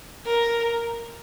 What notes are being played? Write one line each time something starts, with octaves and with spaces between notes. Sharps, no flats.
A#4